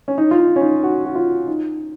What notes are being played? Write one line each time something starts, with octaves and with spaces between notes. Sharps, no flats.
C#4
D#4
F4
D#4
C#4
D#4
F#4
F#4
F4
D#4